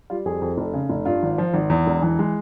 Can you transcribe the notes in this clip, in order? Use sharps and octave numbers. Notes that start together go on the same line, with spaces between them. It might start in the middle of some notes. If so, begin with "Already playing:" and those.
G3 F4
F2 G#4
F2
F1
C#3
F1
G2 F4
G#1
F3
G#1
E2
E1
E3
G#3